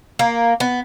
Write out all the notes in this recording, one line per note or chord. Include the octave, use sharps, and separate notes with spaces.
A#3
B3